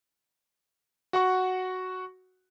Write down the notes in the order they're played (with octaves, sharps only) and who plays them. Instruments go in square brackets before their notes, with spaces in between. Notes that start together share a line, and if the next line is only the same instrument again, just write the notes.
[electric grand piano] F#4 F#5 C#6